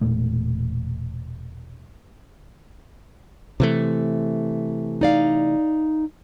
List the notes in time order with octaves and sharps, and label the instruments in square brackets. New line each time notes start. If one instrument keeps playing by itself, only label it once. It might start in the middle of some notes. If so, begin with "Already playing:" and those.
[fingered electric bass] E1 A#2 A3
C3 E3 A3
[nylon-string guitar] D#4 D5 F5